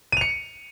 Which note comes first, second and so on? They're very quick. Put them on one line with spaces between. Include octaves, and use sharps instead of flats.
D#7 F7 C#7